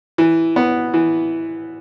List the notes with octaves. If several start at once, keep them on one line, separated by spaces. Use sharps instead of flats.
E3
B3
E3